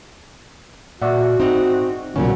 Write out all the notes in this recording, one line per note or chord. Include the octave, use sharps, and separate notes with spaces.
A#2 F#4 D5 E5 F#5
G#2 C4 D#4
B1 A#2 C#3 F3 F#3 C#4